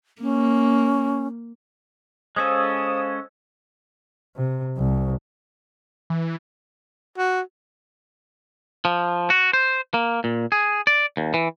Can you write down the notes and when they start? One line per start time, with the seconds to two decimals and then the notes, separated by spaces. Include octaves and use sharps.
0.22 A#3 C#4
2.36 G#3 C#4 A4 C5 F5 D#6
4.37 C3
4.77 C2
6.10 E3
7.18 F#4
8.85 F3
9.30 F#4
9.53 C5
9.94 A#3
10.24 A#2
10.52 G#4
10.87 D5
11.17 D#2
11.34 E3